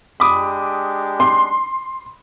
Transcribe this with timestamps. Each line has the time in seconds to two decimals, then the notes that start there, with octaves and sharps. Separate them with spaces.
0.20 G#3 D4 G4 B5 D6 D#6
1.20 C6